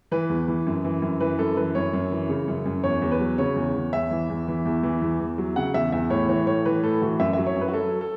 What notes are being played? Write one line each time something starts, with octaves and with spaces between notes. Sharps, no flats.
E3 B4
E2
E3
F#2
E3
F#2
E3 B4
F#2 A4
E3 B4
F#2 C#5
F#2
E3
C#3
F#2
F#2
E2 C#5
E2
B4
F#3
C#3 C#5
E2
E2
E2 E5
E3
E2
E3
E2
E3
E2
E2
F#3
C#3 F#5
E2 E5
E2 E5
A2 C#5
E3 C#5
A2 C#5
E3 B4
A2 A4
E3 F#4
F#2 E5
F#3 E5
C#5
F#2
B4
F#4
F#3 A4
A4